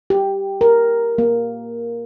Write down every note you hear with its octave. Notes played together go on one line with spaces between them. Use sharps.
G4
A#4
A#3